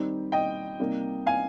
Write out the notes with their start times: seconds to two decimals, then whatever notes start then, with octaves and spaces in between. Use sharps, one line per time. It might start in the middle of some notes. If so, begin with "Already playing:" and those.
Already playing: D#3 G3 C4 D#4
0.32 D#5 G5
0.79 C3 G3 A#3 D#4
1.26 F5 G#5